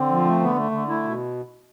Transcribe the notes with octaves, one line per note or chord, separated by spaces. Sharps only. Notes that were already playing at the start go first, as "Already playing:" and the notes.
Already playing: D3 C4
F3
A3
D3 B3
A3
D3
A3 E4
B2